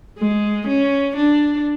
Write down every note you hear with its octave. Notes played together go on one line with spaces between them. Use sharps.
G#3
C#4
D4